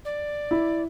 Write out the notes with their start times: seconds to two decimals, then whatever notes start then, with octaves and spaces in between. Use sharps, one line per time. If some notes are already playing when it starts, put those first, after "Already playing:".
0.05 D5
0.51 E4